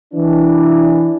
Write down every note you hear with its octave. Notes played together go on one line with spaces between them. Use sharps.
E3 D4